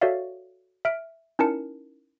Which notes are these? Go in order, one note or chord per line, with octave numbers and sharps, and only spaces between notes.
F#4 A4 C#5 D5 E5 F5
E5 F6 D7
C#4 D#4 E4 A#4 A5 C#7